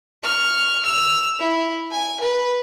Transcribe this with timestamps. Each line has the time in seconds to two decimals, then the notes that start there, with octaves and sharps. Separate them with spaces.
0.24 C#6 F6
0.83 E6 F7
1.39 E4
1.91 G#5
2.20 B4